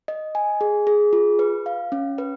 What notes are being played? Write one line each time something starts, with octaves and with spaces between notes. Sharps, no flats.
D#5
G#5
G#4
G#4
F4
B4
F5
C#4
B4